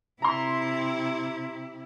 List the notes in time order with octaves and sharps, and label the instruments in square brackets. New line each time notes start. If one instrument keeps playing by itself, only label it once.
[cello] C3 E4 [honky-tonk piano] A#5 C6